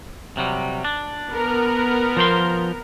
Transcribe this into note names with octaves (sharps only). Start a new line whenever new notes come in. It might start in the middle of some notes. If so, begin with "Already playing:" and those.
C3 F#3 G3
D4
B3 A#4
F3 C5 C6